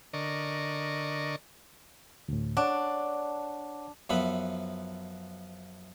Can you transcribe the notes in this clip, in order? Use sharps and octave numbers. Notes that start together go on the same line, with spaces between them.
D3 A#4 D5 D#5 C#6
D2 A2
D4 C#5 F#5 D6
F#2 F3 B3 E5 B5